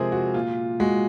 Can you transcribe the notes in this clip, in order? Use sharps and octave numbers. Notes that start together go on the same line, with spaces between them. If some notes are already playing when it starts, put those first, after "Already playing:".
Already playing: C3 F3 G#3 G#4 A#4 C5
F#4
A#2 F4
G#3 F#4